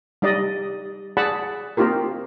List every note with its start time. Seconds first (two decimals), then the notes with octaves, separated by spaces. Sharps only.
0.22 G3 D#4 D5 D#5
1.17 G#4 D5 F#5 A5 B5
1.77 A#3 C4 D#4 F4 G4 A#4